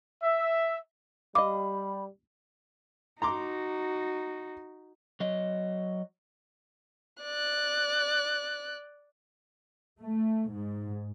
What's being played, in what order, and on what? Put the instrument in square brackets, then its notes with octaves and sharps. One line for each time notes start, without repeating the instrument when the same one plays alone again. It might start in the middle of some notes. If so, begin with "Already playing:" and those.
[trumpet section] E5
[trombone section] G3 [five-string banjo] D#5 F5 [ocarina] B5 [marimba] D6
[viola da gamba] D#4 F#4 [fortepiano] A#5 C6 D6
[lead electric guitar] F#3 D#5
[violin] D5 F#6
[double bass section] A3
G#2